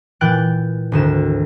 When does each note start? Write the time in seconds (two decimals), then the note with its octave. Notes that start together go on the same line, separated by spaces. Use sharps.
0.21 A#2 E3 G5 F#6 A6 D7
0.92 G#1 D2 E7